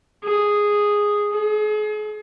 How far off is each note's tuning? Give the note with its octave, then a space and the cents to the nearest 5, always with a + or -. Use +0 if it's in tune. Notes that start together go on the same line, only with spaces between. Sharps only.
G#4 -5
G#4 +40